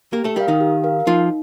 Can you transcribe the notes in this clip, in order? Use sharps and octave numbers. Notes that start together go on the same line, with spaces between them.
A#3 G4 A#4
A3 A4
G3 G4 A#4 F5
D#3 D#4
G4
A#4 F5
F3 D#4 F4